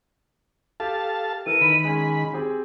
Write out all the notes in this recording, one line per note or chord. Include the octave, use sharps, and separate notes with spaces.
G4 A4 F5 A5
E3 A4 A#4 D#7
D#3 B5
G#3 C#4 G#5
C4 G4 G#4